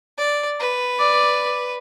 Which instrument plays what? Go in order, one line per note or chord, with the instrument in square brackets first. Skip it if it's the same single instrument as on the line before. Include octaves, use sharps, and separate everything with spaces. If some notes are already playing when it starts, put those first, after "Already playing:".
[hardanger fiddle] D5
B4
[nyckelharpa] D5